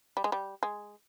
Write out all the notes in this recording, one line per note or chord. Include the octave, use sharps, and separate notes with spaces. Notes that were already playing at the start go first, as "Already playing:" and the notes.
G3
G#3
G3
G#3